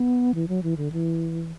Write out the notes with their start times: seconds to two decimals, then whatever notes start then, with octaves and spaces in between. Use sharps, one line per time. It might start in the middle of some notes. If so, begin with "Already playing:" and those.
Already playing: B3
0.35 E3
0.48 F#3
0.63 E3
0.77 D3
0.92 E3